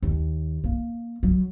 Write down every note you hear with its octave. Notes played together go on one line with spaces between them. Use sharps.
D#2
A#3
F#3